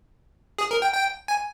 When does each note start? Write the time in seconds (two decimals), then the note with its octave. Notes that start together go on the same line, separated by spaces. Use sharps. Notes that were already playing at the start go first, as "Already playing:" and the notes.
0.58 G#4
0.71 A#4
0.82 G5
0.93 G5
1.28 G#5